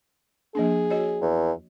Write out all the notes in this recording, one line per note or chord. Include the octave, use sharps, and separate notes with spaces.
F3 A#3 D4 G#4
F#4 C#5 D#5
E2